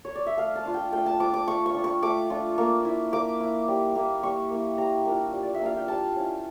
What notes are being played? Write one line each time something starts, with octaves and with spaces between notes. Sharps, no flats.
C#5
D5
E5
A3 F5
A5
D4 F4
G5
A3 G5
A5
D4 F4 D6
D6
A3 C#6
C#6
D4 F4
C#6
A3 D6
D4 F4
A#3
E4
A#3 D6
E4
G3
A#3 E4
G3 C#6
A#3 E4
G3 A#5
A#3 D4 F4
G3
D5
E5
A#3 D4 F4 F5
G5
G3 A5
C#4 E4